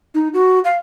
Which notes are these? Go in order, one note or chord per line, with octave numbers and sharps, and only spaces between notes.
D#4
F#4
F5